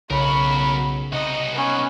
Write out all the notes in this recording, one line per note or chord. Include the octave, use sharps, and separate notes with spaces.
B1 C#3 F#4 A#4 B5
C3 D#4 F#4 D#5
B3 C#4